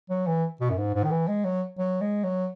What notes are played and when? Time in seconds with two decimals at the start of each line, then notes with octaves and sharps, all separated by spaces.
0.10 F#3
0.27 E3
0.60 B2
0.70 F#2
0.78 G#2
0.95 G#2
1.04 D#3
1.11 E3
1.28 G#3
1.44 F#3
1.78 F#3
2.01 G#3
2.24 F#3